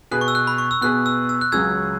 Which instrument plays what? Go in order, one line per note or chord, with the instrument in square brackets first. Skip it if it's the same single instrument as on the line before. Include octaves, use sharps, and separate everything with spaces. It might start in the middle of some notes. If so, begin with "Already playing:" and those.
[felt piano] B2 B3 G#4 B4 [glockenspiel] F#6
[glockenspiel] C#6
E6
F#6
B5
C#6
E6
[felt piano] B2 B3 G#4 B4 [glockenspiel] F#6
[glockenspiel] E6
E6
F#6
[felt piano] C#2 C#3 F#3 C#4 G#4 [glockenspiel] E6 G#6